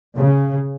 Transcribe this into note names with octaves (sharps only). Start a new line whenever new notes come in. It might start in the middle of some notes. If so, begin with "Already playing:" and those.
C#3